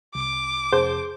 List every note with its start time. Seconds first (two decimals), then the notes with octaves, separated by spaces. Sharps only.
0.15 C2 C3 D6
0.72 F2 C3 G#4 C5 A5